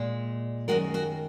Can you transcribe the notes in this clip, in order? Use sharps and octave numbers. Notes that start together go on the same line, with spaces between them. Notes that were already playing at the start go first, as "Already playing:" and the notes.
Already playing: A#2 G#3
F#2 D#3 G#3 F#4 A#4
F#4 A#4